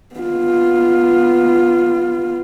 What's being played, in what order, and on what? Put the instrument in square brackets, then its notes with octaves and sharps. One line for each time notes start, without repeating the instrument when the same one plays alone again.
[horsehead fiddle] B3 F4